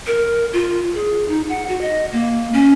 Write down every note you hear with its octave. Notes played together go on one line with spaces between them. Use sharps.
A#4
F4
G#4
D#4
F#5
F#4
D#5
A#3
C#4